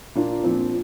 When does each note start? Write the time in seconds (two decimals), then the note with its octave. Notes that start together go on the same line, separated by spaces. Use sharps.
0.15 A#2 A#3 D4 F4
0.44 A#2 F3 C4